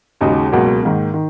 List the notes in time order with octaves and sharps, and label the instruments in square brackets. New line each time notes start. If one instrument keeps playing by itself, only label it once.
[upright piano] D#2 C#3 G#3 D#4 F#4
C#2 B2 F#3 A#3
G#2 D#3 A#3
D#3